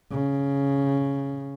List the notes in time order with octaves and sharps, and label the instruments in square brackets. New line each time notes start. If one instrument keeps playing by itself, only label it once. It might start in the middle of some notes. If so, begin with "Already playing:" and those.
[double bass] C#3